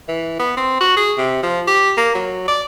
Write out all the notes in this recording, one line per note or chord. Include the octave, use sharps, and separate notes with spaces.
E3
B3
C4
F#4
G#4
C3
F3
G4
A#3
F#3
D5